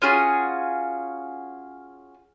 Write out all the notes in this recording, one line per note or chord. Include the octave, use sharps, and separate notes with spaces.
C#4 F4 F#4 G#4